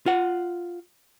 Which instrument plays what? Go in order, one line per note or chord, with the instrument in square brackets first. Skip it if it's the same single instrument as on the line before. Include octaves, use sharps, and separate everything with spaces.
[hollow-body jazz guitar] F4 F#5